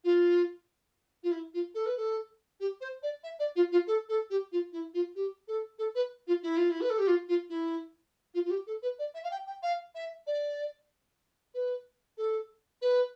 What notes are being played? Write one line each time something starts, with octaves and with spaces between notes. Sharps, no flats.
F4
F4
E4
F4
A4
B4
A4
G4
C5
D5
E5
D5
F4
F4
A4
A4
G4
F4
E4
F4
G4
A4
A4
B4
F4
E4
F4
E4
B4
A4
G4
F4
F4
E4
F4
F4
G4
A4
B4
D5
E5
F5
G5
G5
F5
E5
D5
B4
A4
B4